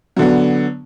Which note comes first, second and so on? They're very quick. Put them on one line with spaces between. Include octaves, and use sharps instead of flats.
F#3 D3 B3